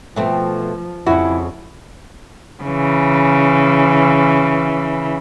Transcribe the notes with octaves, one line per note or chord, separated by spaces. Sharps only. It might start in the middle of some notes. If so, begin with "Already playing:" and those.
B2 F3 A3 C4
F2 C#3 E4 F#4
C#3 E3